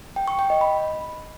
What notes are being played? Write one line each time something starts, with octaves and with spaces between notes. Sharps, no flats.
G5
C#6
G5
D#5
B5